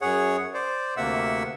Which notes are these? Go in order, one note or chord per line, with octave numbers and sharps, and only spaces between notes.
F#2 G#4 C#5 F#5
C5 D5
D2 C3 A#3 E5 F#5 E6